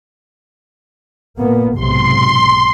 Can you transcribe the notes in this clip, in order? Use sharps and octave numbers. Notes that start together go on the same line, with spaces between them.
A#2 A#3 B3
B1 G#2 C3 C6